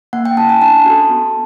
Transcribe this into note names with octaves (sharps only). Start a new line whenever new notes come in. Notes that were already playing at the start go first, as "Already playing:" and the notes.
A#3 F#5
G5
C#4 E4 A5
G#5
D4 A5
F#4 A4
B3